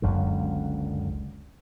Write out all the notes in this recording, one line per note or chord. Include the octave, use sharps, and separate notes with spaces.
F#1 C#2 F#2 D3